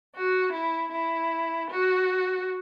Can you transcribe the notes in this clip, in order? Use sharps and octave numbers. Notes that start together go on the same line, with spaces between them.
F#4
E4
E4
F#4